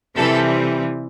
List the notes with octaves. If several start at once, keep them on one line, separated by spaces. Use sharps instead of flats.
C3 E3 G3 C4 A4